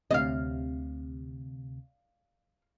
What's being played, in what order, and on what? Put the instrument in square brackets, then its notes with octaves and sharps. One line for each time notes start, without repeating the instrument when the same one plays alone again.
[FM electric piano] D2 C3 [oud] D#5 F5